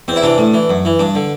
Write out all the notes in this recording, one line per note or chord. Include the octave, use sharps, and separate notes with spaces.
E2 C4
E4
C3 E3 D4
A2
E3
F#2
E3
G2 D4
D3